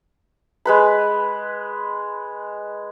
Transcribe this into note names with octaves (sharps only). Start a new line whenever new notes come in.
G#3 B4 B5